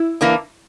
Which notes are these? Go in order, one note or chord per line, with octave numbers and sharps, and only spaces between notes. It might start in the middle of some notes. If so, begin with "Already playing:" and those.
Already playing: E4
E3 A#3 D4